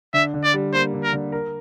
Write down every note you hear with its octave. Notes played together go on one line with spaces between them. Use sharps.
D3 E5
D3
D5
G3
A#3 C5
D3
A#4
D3
A#4